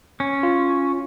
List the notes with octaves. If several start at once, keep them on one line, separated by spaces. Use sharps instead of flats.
C#4
F4